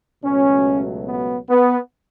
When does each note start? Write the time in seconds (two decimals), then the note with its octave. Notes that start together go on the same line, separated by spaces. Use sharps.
0.23 C#2 B2 F#3 A3 C#4
1.07 B3
1.49 B3